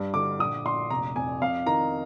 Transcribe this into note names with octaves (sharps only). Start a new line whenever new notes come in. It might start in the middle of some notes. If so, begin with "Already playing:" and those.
Already playing: G2
D3 D6
A#1 D#6
A#1 C6
F1 A#5
F2 G#5
F2 F5
D#3 A#5